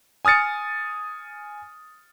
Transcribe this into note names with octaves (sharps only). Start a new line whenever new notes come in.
G#5 D#6 F6 A6 C#7